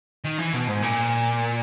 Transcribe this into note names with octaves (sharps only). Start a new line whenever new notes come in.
D#3
E3
B2
G#2
A#2